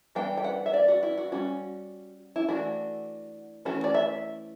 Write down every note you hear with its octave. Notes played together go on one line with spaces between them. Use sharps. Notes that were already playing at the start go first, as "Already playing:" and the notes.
E3 G3 B3 D4 G5
G5
F#5
E5
D5
F#4
E4
F#4
G3 C#4 F#4
E4
E3 A3 D4 F#4
E3 A3 C#4 F#4
D5
E5